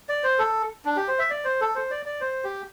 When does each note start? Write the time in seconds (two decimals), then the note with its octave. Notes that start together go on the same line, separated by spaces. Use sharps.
0.09 D5
0.24 C5
0.39 A4
0.85 D4
0.96 G4
1.08 C5
1.19 E5
1.30 D5
1.45 C5
1.61 A4
1.75 C5
1.91 D5
2.06 D5
2.21 C5
2.44 G4